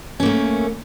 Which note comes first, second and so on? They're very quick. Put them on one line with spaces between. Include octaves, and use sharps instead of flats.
C#4 A#3 A3